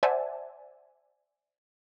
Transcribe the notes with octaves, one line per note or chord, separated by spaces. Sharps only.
C5 D5 E5 F#5 G#5 A5